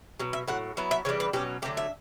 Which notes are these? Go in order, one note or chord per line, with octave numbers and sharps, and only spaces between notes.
B2 F#3
E5
A2 F#3 F#5
F#3 B3 E4
E5
C#3 E3 G3 D4 C#5
B4
B2 F#3 C#4 G4
D3 F#3 A3 G4
E5